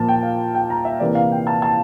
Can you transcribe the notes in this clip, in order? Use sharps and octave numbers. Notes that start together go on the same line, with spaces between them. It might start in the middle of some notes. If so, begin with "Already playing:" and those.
Already playing: A#2 F3 A#3 A5
G5
F5
G5
A#5
E5
C3 E3 A#3 D5
F5
G5
A5
A5